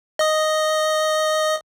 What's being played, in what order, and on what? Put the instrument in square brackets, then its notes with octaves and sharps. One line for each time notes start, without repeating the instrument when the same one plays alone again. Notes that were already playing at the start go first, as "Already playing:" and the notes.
[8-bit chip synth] D#5 D#6